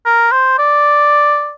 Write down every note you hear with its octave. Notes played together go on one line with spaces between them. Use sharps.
A#4
C5
D5